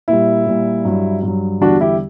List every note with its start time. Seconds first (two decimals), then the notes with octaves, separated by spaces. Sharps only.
0.08 A#2 G3 E4
0.47 A#2 G3
0.85 G2 F#3
1.23 G2
1.28 F#3
1.61 E2 D3 G3 D4 F#4
1.81 E4 G4